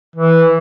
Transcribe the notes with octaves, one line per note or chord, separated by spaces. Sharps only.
E3